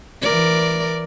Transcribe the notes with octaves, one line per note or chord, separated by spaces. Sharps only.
E3 A#4 D5